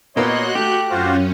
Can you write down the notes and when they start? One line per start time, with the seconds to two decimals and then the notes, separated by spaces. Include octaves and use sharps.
0.16 A#2 A#3 B3 F#4 C#5 D#5 C6 F#6
0.55 A3 G4 G6
0.90 F#2 C#4 F4 F#4 C5